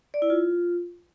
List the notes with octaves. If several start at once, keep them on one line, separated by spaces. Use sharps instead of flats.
D5
E4
F4